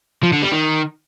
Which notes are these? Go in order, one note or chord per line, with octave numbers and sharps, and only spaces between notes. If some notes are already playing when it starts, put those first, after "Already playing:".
F3
D3
G3
D#3